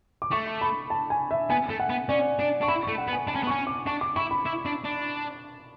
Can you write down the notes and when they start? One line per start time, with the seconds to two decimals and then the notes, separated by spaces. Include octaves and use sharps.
0.22 D6
0.31 A3 C#6
0.61 B5
0.90 A5
1.10 G#5
1.31 E5
1.50 B3 G#5
1.69 A3
1.80 F#5
1.90 B3
2.09 C#4 D5
2.39 D4 D5
2.61 D4 C#6
2.68 E4 B5
2.83 A3 C#6
2.98 F#5
3.08 B3
3.13 G#5
3.27 D4 A5
3.35 C#4
3.43 B3
3.47 C#4 C#6
3.67 D6
3.87 D4 C#6
4.01 D6
4.16 E4 C#6
4.31 B5
4.46 E4
4.66 D4
4.85 D4